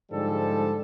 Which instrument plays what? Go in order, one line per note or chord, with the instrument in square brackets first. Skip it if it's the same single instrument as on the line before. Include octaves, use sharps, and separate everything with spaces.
[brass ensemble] G#2 D3 F3 G3 G#4 A4